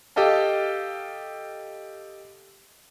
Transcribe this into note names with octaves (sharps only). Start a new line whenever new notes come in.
G4 A4 D#5 F5 A5